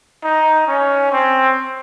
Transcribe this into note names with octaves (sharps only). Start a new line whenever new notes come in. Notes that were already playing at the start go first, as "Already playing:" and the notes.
D#4
C#4
C4